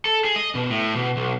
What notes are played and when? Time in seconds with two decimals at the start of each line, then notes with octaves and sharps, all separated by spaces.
0.05 A4
0.24 G#4
0.36 D#5
0.55 B2
0.70 A2
0.95 B2
1.17 B1